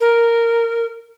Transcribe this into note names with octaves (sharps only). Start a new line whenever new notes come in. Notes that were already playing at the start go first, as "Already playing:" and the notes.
A#4